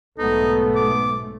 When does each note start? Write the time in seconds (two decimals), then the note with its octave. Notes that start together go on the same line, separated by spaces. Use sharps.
0.18 B1 G#2 A3 B3 D#4 A4
0.76 D6